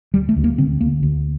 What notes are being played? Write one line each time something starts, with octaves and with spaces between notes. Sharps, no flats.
D2 G3
A3
D2
A#3
D3 C4
D2 A#3
D2